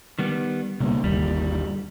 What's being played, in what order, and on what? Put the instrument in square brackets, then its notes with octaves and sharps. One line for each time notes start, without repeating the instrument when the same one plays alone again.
[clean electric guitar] D#3 G3 B3
[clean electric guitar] C#2 [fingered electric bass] B2 G3 A#3
[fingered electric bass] G1 D#2 [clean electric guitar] G3